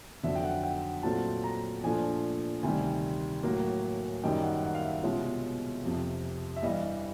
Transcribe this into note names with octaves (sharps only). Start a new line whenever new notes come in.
F2 D3 F#3 E5
G5
F#5
G5
A#2 F#3 A3 C4 F4 A5
A#5
A#2 F3 A3 D4 F4 G#5
D2 C3 D#3 G3 G#5
A2 F#3 A#3
F#2 D#3 G3 A#3 D#4 G5
F#5
F#5
F5
E5
C2 B2 G#3 C#4 F4
F2 C3 F3
E5
G2 E3 G3 D#5